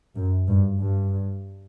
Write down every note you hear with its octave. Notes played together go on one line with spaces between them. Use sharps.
F#2
G2
G2